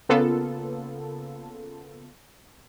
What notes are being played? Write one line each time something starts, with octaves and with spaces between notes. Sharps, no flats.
C#3 A#3 B3 F4 A4